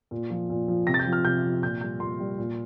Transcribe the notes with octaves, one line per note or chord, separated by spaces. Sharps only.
A#2
F3
A#2
F3
C3 A#6
A6
G6
F3
F6
C3 G6
F3
A#2 G6
G3 G6
A#2 C6
G3
A#2